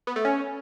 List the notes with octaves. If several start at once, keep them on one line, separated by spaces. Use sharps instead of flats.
B3
A3
C#4